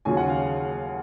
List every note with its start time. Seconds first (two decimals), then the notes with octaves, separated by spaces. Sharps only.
0.05 D#2 C#3 F#3 C#4 F4 G#5
0.17 F#5
0.30 F5